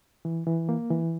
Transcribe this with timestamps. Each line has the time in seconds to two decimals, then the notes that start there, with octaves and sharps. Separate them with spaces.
0.25 E3
0.47 E3
0.69 A#3
0.90 E3